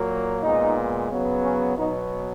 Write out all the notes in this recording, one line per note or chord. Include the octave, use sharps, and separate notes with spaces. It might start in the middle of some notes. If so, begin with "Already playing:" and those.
Already playing: A#2 F#3 A#3
A#2 G#3 B3 D#4
C#3 F#3 B3
C#4
B2 F#3 B3 D#4